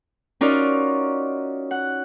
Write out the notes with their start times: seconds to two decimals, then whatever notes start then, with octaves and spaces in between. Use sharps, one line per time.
0.41 C#4 D#4 F4 F#4 A#4 D5
1.71 F#5